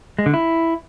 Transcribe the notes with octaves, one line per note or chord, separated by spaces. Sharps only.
G#3
D3
E4